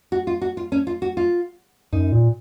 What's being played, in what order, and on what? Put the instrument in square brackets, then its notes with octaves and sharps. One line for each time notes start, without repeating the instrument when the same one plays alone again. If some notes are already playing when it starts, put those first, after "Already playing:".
[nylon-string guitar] F#4
F4
F#4
F4
C#4
F4
F#4
F4
[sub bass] F#2 [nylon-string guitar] D#4
[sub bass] A#2